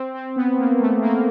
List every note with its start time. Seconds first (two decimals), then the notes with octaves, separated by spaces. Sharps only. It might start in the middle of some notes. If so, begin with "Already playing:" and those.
Already playing: C4
0.14 C4
0.36 B3
0.59 A#3
0.80 A3
1.02 A#3